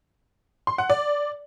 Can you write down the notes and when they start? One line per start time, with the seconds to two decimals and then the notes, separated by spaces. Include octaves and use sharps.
0.67 C6
0.78 F#5
0.90 D5